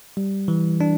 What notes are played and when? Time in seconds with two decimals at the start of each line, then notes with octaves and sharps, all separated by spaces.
0.17 G3
0.48 E3
0.81 D4